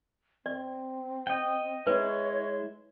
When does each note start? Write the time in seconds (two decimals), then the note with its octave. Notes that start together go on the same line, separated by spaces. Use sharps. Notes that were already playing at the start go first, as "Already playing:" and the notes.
0.46 C4 D5
1.27 D#5 G5
1.87 G#3 E4 B4 C#5